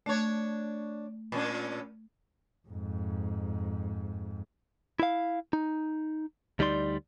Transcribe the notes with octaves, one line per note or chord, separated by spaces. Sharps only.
A3 D4 C#5
A#2 C#4 D4
F2 G#2
E4 F5
D#4
D2 G3 D#4 D5 C6